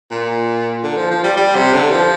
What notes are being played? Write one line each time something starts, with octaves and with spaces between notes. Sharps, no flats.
A#2
D3
F3
F3
G3
G3
C3
D3
F3